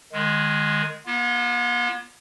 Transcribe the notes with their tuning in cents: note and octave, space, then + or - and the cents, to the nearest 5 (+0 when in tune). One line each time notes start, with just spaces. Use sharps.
D#3 -35 G#3 +0
B3 -45 F4 -10